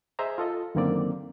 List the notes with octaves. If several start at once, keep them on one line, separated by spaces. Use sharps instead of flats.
G#4 C5 D#5 E5 A#5
F4 A4 D#5
F#2 D3 D#3 A#3 C4 D5